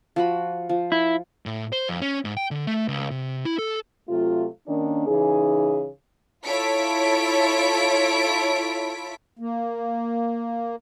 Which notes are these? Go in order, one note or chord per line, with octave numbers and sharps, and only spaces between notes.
F3 F#4 B5
F3
E4
A2
C5
F2
C#4
G#2
G5
D3
A3
C#2
C3
E4
A4
C3 F#3 A3 F4
D#3 A#3 C#4 D4
C#3 E3 D#4 G#4
E4 F4 A4 C#5 B6 D7
A#3